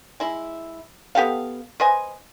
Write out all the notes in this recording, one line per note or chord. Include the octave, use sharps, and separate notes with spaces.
G#3 E4
B3 G4 A4 F5
B4 C5 D#5 G#5